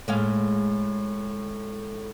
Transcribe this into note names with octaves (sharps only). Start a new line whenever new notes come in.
A2 G#3 F5